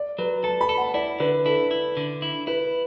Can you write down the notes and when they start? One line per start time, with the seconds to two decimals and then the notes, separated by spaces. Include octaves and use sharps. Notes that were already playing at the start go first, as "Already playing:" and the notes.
Already playing: D5
0.18 F#3 B4
0.44 A4 A5
0.61 B5
0.69 A4
0.77 F#5
0.94 E4 D5
1.20 D3 B4
1.45 E4 A4
1.71 E4
1.97 D3
2.22 E4
2.47 E4 B4